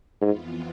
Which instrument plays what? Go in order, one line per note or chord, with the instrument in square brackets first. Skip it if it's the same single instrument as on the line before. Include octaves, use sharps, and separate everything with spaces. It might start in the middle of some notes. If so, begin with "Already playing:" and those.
[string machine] F2 E3 B3 F4 [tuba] G#2